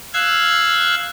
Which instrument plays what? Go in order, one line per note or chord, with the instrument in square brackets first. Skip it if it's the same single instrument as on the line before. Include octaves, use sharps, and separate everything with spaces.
[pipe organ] F5 E6 F#6 G#6